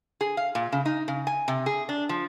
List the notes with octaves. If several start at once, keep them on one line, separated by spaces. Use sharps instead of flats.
G#4
F5
A#2
C#3
D#4
C#3
G#5
C3
G#4
D4
F3